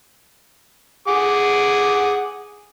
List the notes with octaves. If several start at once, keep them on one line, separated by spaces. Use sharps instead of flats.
G#4 F#5 D6